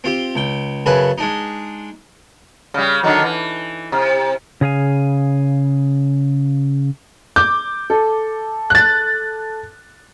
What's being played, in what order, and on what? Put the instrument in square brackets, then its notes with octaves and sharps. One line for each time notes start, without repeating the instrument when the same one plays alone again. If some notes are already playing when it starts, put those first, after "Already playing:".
[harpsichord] C4 F4 G4
C#2 G5
F#2 C#3 B4 G#5 A5
G#3 D4 D#4
[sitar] C#3 G3
D3 D#3 F#3
E3
C3
[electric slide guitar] C#3 G#4 F5 G#5
[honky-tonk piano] D6 [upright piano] G6
[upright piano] A4
[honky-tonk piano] F#6 A6